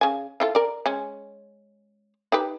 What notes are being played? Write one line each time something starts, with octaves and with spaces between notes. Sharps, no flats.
C#3 G#5
E4 F4 A4
A#4 D5
G#3 C#4
D#4 G4 B4